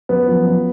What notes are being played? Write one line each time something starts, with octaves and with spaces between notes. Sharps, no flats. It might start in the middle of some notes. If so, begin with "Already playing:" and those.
F#2 B3
F3
F#2